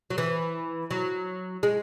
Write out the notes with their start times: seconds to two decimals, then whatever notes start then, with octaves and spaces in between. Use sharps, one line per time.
0.10 F#3
0.18 E3
0.91 F#3
1.63 G#3